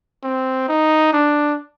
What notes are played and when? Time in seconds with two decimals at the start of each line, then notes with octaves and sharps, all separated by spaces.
0.23 C4
0.68 D#4
1.13 D4